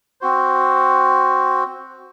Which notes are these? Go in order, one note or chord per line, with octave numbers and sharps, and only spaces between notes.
C4 F#4 C5